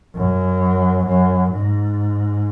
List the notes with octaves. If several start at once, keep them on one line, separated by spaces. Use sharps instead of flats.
F#2
F#2
G#2